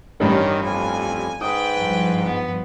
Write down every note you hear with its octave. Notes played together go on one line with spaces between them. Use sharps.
A1 G2 D#3 C#4
F2 G#5
G#2 B4 G5 D#6
G2 F3
B3